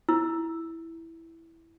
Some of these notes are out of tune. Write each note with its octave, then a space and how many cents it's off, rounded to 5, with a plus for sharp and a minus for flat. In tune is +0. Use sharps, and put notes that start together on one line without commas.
E4 +0 E6 +0